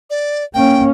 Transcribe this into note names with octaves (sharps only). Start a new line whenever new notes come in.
D5
A#3 C#4 G5